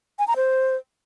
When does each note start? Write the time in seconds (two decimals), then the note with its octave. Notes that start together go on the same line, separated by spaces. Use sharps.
0.19 G#5
0.28 A#5
0.36 C5